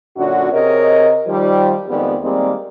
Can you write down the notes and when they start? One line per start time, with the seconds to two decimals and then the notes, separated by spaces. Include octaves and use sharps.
0.17 F#2 A#2 D3 C#4 F#4
0.52 C3 G#4 A#4 C#5 D#5
1.27 D#3 F3 G3
1.89 F2 D#3 G#3 B3 G4 D5
2.22 D#3 G3 G#3 A#3 C4 D5